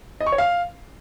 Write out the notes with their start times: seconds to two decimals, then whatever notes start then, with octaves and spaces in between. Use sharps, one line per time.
0.21 D#5
0.26 C#6
0.32 C#5
0.38 F5